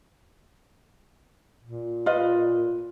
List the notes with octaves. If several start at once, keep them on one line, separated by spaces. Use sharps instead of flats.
A#2
F4 B4 D#5